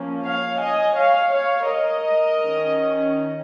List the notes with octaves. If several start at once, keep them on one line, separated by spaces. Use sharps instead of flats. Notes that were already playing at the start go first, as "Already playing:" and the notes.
Already playing: F3 A#3 C#4
C#5 F5
D#5 G#5
C#5 F5
C#5 F5
A#4 D#5
D#3 C#4